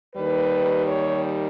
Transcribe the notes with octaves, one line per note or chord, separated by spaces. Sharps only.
D#2 D#3 G3 B4
C#5